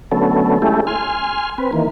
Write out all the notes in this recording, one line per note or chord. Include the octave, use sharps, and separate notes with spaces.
D3 F#3 A3 B3 C#4 A4
G#3 A3 C#4 E4 G4 A4
G#5 C6 F6
C4 B4
D#3 E3 A#3